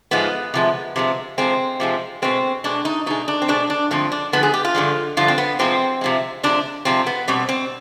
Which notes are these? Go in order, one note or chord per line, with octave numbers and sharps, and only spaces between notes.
G#2 F3 G#3 B3
C3 F3 G#3
C3 F3 G#3
C3 F3 G#3 C4
C3 F3 G#3
B2 G#3 C4
B2 G#3 D4
D#4
B2 G#3 D#4
D4
C4
B2 G#3 D4
D4
G2 D3 F3 G#3 C4
D4
G2 D3 F3 G#3 B3
G#4
G4
F4
G2 D3 F3 G#3
G2 D3 F3 F4
C4
B3
C3 F3 G#3 C4
C3 F3 G#3
C3 F3 G#3 D4
C3 F3 G#3 C4
B3
B2 G3 C4
C4